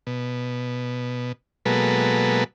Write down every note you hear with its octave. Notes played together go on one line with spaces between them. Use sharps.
B2
B2 F#3 G#3 A#3 A4 B4